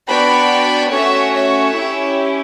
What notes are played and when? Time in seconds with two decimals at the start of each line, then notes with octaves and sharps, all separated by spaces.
0.09 B3 D4 F#4 G5 B5
0.92 A3 C#4 F#4 C#5 E5
1.34 C#5 E5
1.76 C#4 E4 G4